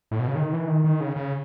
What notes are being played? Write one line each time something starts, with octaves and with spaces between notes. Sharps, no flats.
A2
B2
C#3
D#3
E3
D#3
D#3
C#3
C#3